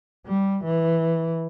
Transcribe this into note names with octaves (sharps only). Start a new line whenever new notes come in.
G3
E3